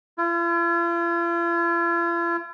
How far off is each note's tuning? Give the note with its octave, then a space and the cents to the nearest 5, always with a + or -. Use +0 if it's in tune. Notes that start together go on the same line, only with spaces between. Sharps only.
F4 -45